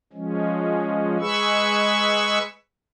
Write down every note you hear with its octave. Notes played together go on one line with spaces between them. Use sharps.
F3 G#3 C#4
G#3 G#4 B4 B5 C#6 E6